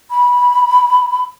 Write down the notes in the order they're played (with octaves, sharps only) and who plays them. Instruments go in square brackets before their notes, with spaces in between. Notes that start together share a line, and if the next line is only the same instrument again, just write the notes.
[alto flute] B5